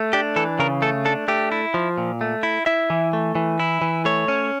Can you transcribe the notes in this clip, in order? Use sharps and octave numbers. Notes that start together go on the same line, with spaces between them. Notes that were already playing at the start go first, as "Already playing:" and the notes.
Already playing: A3
D4 G4
E3 A4
C#3 A#4
A3 A4
D4 A4
A3 G4
E4
F3
A#2
A3
E4
E4 E5
E3
A3
E3
E4
E3
A3 C#5
C#4